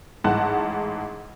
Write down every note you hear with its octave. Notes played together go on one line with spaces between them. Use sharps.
A1 G#2 F#5 A5 F#6